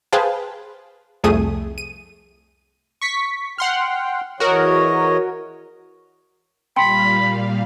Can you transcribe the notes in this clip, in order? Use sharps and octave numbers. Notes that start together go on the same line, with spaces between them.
G#4 B4 C5 F5 G5 A5
C2 F2 A3 G#4 D#6 D#7
D#7
C#6 B6
F#5 G5 C6 F6
E2 F#4 A#4 C#5 D#5
A#2 G3 F5 G5 B5 C6 C#7